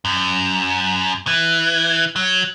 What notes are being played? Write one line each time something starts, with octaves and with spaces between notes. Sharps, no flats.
F#2
E3
F#3